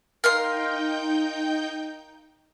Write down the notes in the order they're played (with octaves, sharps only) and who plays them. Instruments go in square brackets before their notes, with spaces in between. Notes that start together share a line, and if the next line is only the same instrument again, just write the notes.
[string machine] D#4 G5 G6 [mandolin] A#4 F5 C6